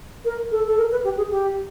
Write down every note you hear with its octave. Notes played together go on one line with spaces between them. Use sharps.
A#4
A4
A4
A#4
B4
G4
G#4
G4